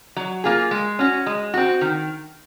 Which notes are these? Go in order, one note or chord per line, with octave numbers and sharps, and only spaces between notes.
F#3
A#3 F4 G#4
G#3
C#4 F#4
G#3
C4 F#4
D#3